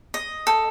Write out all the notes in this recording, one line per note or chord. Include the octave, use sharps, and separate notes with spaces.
D#5
A4